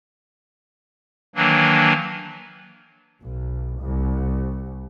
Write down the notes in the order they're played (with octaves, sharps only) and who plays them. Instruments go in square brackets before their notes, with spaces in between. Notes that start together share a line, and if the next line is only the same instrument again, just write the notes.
[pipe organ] D#3 E3 F#3 A#3 D4
[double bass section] B1
C2